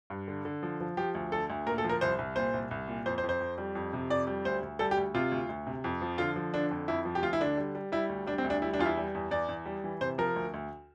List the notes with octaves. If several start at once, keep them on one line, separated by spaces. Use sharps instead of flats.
G2
D3
D3
F3
F3
F3 G4
D2
D3 A4
D2
A#2 A#4
A4
F3
A#4
C2 C5
C2
A#2 C5
C2
C2
A#2
F2 C5
C5
F2
C5
F2
G3
F2
C3
F2 D5
G3
D2 C5
D2
G3 A4
G4
D2
C3 F4
D2
D2
C3
F2
F3
D3 F4
F3
D3 D4
F2
F2 E4
F3
G4
D2 F4
E4
D3 D4
G3
G3
G3 E4
D2
G3 D4
C4
D2
D4
G3 E4
D4
E2 F4
E4
G3
E2
E2 D5
E2
G3
E3
C3 C5
F3 A#4
D2
D2